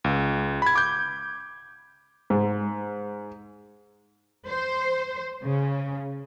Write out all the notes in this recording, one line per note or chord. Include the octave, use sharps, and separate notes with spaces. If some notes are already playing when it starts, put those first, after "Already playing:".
C#2
B5 G#6
D6 G6
G#2
C5
C#3